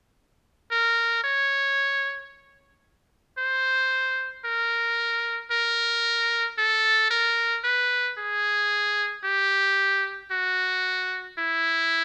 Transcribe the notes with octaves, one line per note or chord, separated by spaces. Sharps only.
A#4
C#5
C5
A#4
A#4
A4
A#4
B4
G#4
G4
F#4
E4